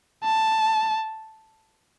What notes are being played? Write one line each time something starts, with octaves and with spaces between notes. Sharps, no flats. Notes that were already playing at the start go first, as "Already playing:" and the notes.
A5